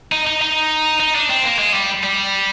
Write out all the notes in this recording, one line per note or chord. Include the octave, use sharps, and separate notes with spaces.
D#4
D#4
D#4
D#4
D4
C4
A#3
G#3
G3
G3